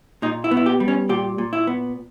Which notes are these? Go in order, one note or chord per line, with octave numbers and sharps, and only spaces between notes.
A#2 D#4
E4
B3
E4
G4
G3
C#4
A#2 G4
A#2
E4
B3